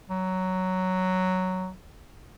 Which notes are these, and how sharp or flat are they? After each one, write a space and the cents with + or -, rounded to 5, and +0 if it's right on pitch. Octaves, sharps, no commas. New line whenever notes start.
F#3 +5